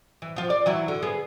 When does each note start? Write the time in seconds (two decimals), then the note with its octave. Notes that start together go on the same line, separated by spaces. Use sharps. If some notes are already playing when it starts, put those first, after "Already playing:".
0.22 E3
0.36 F3 F4
0.50 D5
0.66 E3 F#3 E4
0.88 D3
1.02 B3 G#4